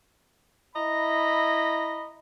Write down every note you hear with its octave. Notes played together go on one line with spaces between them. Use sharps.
E4 D#5 A#5 B5